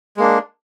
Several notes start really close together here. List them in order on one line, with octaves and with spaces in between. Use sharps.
G#3 A#3 D4